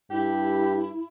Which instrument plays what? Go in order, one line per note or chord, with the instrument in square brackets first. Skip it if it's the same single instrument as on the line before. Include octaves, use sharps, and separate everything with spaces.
[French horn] G2 [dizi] E4 [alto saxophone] G4